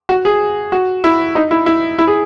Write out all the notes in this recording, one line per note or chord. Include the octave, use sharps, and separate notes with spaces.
F#4
G#4
F#4
E4
D#4
E4
E4
E4
G#4